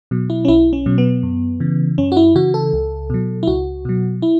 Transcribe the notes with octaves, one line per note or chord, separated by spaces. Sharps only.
B2 F#3
E4
C#4
B1 E4
C#4
B2 F#3
B3
F#2
C#3 E3
F#2 C#4
F#4
E4
C#3 E3 F#4
A4
C#2
B2 F#3
E4
C#2 F#4
B2 F#3
E4